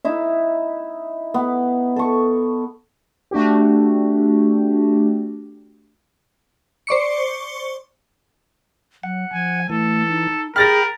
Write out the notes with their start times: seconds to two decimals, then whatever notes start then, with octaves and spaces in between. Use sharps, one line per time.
0.05 D#4 E4 E5
1.34 B3
1.96 A4 C#6
3.31 A3 D4 F#4 G4
6.87 C5 D5 C#6 C#7
9.03 F#3 F#5
9.33 F3 G#5
9.70 E3 A3 A4
10.09 D#4
10.56 G#4 A#4 G5 B5 F6 A6 A#6